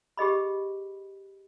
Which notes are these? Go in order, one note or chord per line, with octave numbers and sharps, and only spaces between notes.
G4 G#4 D#5 B5